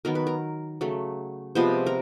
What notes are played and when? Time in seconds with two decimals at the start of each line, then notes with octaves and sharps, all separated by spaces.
0.05 D#3 F#3 B3 A#4
0.15 B4
0.27 A#4
0.81 C#3 F#3 A3
1.55 C3 F3 G#3 B3 C5
1.86 A#4